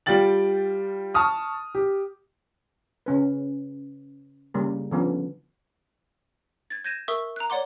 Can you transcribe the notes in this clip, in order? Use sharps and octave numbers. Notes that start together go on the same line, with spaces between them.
G3 F4 G5 A6 F#7
A5 C#6 D#6 F6
G4
C#3 C#4 B4
C#3 G3 A#3
D3 F3 B3 C#4
G#6 A6
G6 G#6 A#6 D#7 E7
A#4 E5 C#6 D#6 E6
A#5 F#6
C#5 D5 F#5 C6 D6